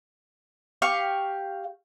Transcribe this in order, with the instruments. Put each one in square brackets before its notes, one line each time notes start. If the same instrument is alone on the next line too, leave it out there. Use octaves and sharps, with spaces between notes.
[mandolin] G4 F5 C#6